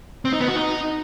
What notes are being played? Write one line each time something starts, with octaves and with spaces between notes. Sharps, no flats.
C4
D#4
B3
F#4
D#4